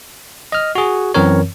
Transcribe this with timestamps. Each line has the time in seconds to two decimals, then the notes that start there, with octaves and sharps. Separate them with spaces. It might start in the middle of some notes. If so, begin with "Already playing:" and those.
0.52 D#5 F6
0.75 F#4 G#4
1.14 F#2 E3 C4 A#4 C#5